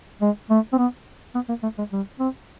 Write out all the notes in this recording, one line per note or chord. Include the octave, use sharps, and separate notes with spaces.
G#3
A3
C4
B3
B3
A#3
A3
G#3
G3
C4